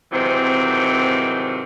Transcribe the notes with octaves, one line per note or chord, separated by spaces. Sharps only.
G#2 C3 D#3 E3 F#3 C4